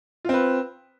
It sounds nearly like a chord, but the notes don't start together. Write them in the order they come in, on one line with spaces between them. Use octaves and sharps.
F4 C4 B4